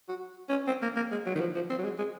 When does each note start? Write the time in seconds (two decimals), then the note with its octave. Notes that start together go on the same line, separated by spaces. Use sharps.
0.09 F#4
0.49 C#4
0.67 C4
0.82 A#3
0.96 A#3
1.11 G#3
1.26 F#3
1.35 D#3
1.40 F3
1.55 F3
1.70 C4
1.78 F#3
1.84 G#3
1.98 G#3